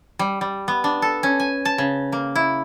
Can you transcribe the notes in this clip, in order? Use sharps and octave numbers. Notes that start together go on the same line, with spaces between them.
G3
G3
B3
D4
A4
C#4
G#5
A5
C#3
A#3
E4